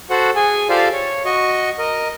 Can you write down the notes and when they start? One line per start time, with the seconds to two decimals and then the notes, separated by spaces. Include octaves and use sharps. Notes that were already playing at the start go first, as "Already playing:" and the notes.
0.10 F#4 A4 C5 F#5
0.36 G#4 G#5
0.69 F4 G4 A4 C5 D5 F5
0.93 C#5
1.25 F#4 D#5 C#6
1.79 A#4 D#5